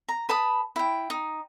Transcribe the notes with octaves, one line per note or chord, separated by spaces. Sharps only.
A#5
B4 A5 B5 D#6
E4 G5
D#4